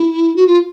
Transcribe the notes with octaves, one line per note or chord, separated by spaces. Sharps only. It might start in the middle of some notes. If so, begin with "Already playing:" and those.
Already playing: E4
F#4
F4